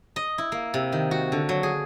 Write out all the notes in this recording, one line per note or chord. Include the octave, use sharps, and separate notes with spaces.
D#5
E4
A#3
C3
D#3
F#4
D3
F#3
G#4